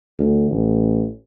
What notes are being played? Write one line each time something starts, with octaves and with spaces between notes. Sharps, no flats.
D2
A1